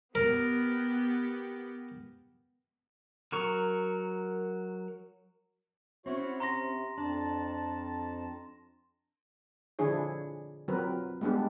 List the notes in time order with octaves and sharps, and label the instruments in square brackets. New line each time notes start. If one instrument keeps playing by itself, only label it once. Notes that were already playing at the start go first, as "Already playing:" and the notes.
[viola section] B3 G4 [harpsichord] A#4
[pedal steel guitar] F#3 A#4 C#6
[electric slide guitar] C4 C#4 [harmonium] E4 F#4 C#5
[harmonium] C3 [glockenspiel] A#5 C6 A#6
[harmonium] F2 A5 [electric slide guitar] D4
[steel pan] D3 F3 D4 E4 G#4 C#5
F#3 C4 F4 A#4 B4
G3 G#3 B3 D4 G4